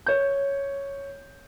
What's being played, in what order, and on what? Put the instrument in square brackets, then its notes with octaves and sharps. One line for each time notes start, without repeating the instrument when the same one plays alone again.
[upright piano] C#5 G6